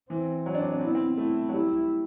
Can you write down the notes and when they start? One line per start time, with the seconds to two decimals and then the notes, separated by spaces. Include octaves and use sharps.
0.10 E3 C4
0.46 F#3
0.55 D4
0.63 C4
0.72 D4
0.79 C4
0.82 E4
0.87 B3
0.95 C4
1.17 A3 E4
1.49 F#3
1.53 G3 E4